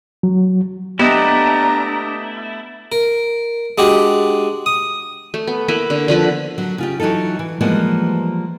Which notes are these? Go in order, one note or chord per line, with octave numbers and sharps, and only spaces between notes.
F#3
A3 B3 D4 E4 G4 D#5 A#5
A#4
G#3 D4 F#4 G4
D#6
A3
B3
A#3 B3 E4 B4
D3
D3 F3 B4
F#3
C#3 F4 G4
E3 F#3 D#4 F4 A4
E3
E3 F3 G3 G#3 A#3 B3